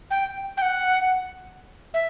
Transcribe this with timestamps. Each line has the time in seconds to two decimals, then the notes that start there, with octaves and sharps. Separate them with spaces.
0.11 G5
0.57 G5
0.62 F#5
1.94 E5